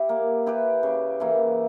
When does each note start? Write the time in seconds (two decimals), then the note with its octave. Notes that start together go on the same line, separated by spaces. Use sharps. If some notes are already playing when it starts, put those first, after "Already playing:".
Already playing: E4 G4
0.09 A#3
0.46 E4 G4 B4
0.83 C#3
1.20 E3 A#3 E4